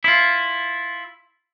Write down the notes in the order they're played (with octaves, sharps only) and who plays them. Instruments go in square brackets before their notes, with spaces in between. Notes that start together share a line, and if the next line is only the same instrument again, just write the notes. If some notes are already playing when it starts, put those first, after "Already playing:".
[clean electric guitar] E4 F4